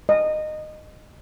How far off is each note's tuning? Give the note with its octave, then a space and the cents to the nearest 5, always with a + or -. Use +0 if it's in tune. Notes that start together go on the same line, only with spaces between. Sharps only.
D#5 -20